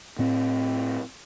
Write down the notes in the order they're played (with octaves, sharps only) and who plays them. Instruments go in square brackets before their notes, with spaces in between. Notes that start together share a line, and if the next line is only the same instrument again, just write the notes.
[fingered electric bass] A2 C4